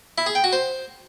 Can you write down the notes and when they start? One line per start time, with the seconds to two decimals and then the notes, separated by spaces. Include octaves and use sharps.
0.18 E4
0.26 G#4
0.35 G5
0.44 F#4
0.53 C5